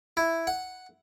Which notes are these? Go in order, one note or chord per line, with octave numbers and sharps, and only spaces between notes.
E4
F#5